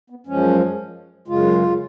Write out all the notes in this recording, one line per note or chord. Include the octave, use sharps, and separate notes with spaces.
B3
F#2 F3 G#3 C#4
F#2 C#3 G#3 F4